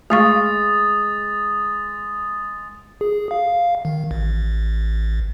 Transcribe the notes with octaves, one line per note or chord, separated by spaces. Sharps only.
G#3 A3 F5 C#6 D#6 A6
G#4
F5
D#3
A1